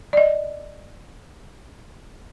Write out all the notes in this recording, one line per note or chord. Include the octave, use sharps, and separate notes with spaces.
D5 D#5